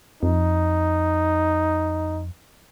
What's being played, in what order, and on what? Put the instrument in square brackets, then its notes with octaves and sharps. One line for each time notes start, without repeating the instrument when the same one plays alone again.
[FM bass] F2 [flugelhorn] D#4